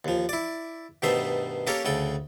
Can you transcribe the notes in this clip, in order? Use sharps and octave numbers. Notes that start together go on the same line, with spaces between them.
D#2 F3
E4 D5
G2 B2 D#3 A3 C5 E5
A#3 C#4 G4 A4 A#4 C#5
D2 C#3 A4 G5